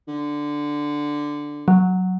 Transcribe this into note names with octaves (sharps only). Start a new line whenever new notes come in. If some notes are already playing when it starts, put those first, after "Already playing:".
D3
F#3